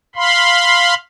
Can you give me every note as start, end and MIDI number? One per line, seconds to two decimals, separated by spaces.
0.16 0.94 77
0.16 0.94 83
0.16 0.94 84